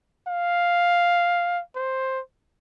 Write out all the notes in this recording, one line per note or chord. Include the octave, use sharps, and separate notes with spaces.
F5
C5